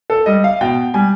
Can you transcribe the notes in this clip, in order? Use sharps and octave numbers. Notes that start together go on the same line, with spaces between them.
A4
G3 D#5
F5
B2 G5
G3 G#5